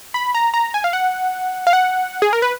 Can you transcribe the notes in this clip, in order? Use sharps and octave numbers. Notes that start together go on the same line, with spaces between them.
B5
A#5
A#5
G#5
F5
F#5
F5
F#5
G#4
A#4
B4